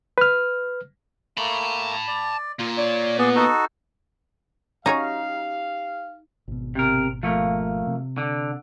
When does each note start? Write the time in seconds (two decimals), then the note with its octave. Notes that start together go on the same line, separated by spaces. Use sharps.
0.18 B4 F6
1.37 A3 A#3 A5 B5
2.07 D5
2.59 A#3 F4
2.78 C#5 D5
3.18 B3 G#4 D5
3.36 D#4 F#4 A4
4.86 F#3 C#4 D#4 G4 C#5 F5
6.48 G#1 B2
6.75 C3 A#4
7.23 F3 A3 A#3
7.87 C3
8.18 D3